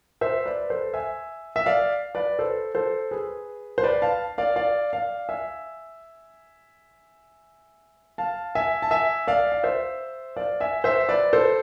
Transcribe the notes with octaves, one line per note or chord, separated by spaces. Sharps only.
C5 E5
B4 D5
A4 C5
E5 G#5
E5
D5 F5
B4 D5
A4 C5
A4 C5
G#4 B4
C5
B4 D5
F5 A5
D5 F5
D5 F5
D5 F5
E5 G#5
F5 A5
E5 G#5
A5
E5 G#5
D5 F5
F5
C5 E5
D5 F5
E5 G#5
C5 E5
B4 D5
A4 C5